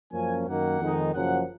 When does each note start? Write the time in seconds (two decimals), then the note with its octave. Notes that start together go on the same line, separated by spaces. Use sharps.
0.12 F#2 F3 A#3 C#4 G#5
0.46 F#2 D#3 A#3 F#5
0.80 F2 D#3 G#3 D#4
1.14 F#1 F#2 F3 F#5